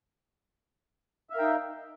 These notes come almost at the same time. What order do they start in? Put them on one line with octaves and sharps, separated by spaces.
E5 F5 A#4 G5 D#4